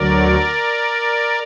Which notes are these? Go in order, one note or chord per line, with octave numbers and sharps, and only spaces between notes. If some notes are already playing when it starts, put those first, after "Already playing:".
Already playing: D2 D3 F#3 A#4 D5